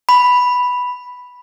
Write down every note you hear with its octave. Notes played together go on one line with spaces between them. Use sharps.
B5